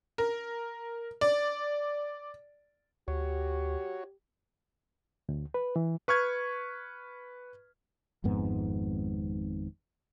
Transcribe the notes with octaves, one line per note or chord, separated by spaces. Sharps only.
A#4
D5
D2 F#4 G4 C#5
D2
B4
E3
B4 C#6 F6 G#6
G#1 F2 G#2 B3